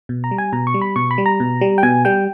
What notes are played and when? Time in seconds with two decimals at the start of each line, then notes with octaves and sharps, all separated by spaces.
0.09 B2
0.24 A#5
0.31 G3
0.38 G#5
0.52 B2 A#5
0.67 C#6
0.74 G3
0.81 B5
0.96 B2 C#6
1.11 B5
1.18 G3
1.26 A#5
1.40 B2
1.61 G3
1.78 G5
1.83 B2 G#5
2.05 G3 G5